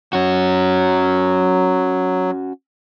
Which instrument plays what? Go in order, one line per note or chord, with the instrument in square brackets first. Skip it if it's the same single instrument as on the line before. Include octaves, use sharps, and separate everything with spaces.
[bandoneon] F#3 [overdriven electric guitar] C#4 F#4